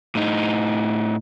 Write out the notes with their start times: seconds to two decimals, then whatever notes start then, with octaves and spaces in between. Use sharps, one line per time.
0.15 A2 D#4